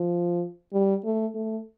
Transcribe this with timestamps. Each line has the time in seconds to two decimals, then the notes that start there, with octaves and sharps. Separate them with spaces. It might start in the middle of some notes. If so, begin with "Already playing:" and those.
Already playing: F3
0.73 G3
1.04 A3
1.35 A3